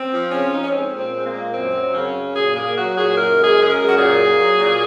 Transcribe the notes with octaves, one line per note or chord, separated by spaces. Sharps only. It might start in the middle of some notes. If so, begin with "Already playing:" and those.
Already playing: C4
F3
C#3 C#4
F4
F2 D#4
C#4
G#3 C4
A#2
C4
G#3
C4
A#3
A#2
F#2 C4
F#3
C#3 C#4
F#2
A#2 G#4
A#3 G#4
F#3 F#4
A#2 G#4
F#2 A#4
G#3
G#4
C#3 G#4
A#4
F#2
F#4
A#2 G#4
A#3
F#3
A#2